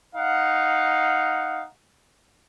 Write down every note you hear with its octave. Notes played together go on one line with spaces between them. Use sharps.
D#4 F5 F#5